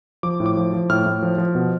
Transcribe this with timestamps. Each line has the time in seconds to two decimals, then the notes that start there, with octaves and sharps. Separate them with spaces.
0.23 F3 D6
0.40 A2
0.46 D6
0.57 F3
0.73 F3
0.90 A2 F6
1.06 A2
1.23 F3
1.38 F3
1.55 B2